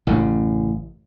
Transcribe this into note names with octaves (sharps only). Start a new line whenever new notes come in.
A1 F#2 C#3